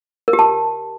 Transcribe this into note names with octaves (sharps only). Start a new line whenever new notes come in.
A#4
G4
A5